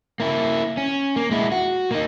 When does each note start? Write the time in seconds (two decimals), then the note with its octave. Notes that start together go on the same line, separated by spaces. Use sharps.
0.20 A#3 E4
0.77 C#4
1.16 A#3
1.31 G#3 E4
1.52 F#4
1.91 A#3 D#4